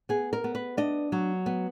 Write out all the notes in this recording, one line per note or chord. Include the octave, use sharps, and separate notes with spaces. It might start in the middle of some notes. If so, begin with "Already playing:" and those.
B3 G#4
A#4
B3
B4
D4 D#5
F#3
B3